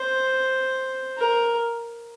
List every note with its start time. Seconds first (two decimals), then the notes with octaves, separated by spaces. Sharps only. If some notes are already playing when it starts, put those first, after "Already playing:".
Already playing: C5
1.18 A#4